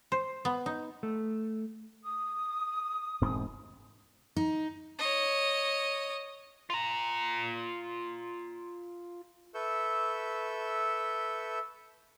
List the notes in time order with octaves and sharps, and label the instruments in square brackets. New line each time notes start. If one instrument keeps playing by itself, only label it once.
[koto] C5
B3
D#4
[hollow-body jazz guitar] A3
[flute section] D#6
[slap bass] E1 G#2 C4
[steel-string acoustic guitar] D#4
[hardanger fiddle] C#5 D#5
[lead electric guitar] F4 A#5
[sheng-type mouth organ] A4 B4 E5 C#6 E6 G6